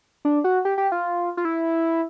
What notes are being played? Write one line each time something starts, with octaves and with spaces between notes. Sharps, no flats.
D4
F#4
G4
G4
F4
F4
E4